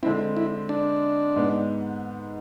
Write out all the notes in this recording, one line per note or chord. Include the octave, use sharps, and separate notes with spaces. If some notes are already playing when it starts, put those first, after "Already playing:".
D3 G#3 C4 E4
E4
D4
G#2 G#3 B3